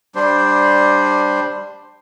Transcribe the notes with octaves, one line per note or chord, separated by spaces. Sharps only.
G3 D4 C5